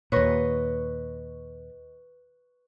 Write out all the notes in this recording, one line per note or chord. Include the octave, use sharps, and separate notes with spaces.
D#2 A#2 B4 C#5 D#5 C#6